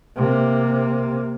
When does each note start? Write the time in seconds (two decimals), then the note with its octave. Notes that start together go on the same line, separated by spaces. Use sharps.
0.16 C3 A#3